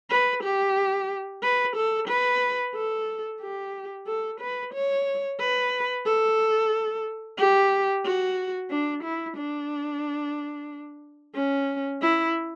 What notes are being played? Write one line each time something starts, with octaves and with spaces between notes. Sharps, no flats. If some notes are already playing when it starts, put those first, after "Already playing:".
B4
G4
B4
A4
B4
A4
G4
A4
B4
C#5
B4
A4
G4
F#4
D4
E4
D4
C#4
E4